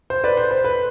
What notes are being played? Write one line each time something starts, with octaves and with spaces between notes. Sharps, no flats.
C5
B4 D5
C5
C5
B4